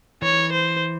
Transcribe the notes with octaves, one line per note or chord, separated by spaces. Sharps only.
E3 C#5
C5